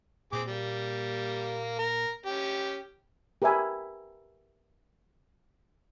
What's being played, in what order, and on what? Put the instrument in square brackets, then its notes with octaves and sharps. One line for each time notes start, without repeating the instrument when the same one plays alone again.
[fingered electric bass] A#2 [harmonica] C4 G#4 D6
[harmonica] G3 A#3
A#4
C#4 G4
[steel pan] G4 A#4 B4 E5 G#5 B5